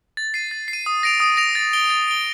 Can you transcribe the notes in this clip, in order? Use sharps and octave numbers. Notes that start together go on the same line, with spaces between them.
A6
C7 D#7
A6
C7
D#7
D#6
A#6 D7 F7
D#6
A#6 D7 F7
A6
D7 G7
A6
D7 G7